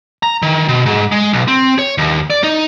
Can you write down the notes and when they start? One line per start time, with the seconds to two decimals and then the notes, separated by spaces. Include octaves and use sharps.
0.23 A#5
0.42 D#3
0.69 B2
0.86 G#2
1.12 G#3
1.33 B1
1.48 C4
1.79 C#5
1.98 D#2
2.30 D5
2.44 D#4